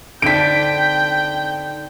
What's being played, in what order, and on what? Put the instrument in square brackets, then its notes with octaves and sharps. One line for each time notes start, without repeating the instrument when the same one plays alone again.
[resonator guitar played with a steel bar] D3 D4 [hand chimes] C4 D#4 [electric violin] G5 [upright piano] B6 D7